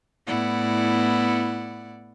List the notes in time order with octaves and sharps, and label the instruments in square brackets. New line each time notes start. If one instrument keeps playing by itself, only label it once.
[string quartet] A2 B3 E4 D5 F#5